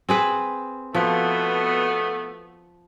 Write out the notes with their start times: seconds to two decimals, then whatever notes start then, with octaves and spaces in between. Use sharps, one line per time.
0.09 C4 G#4 B4
0.95 B2 F3 A3 B3